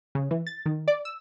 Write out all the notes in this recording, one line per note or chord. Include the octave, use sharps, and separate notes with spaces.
C#3
E3
A6
D#3
D5
E6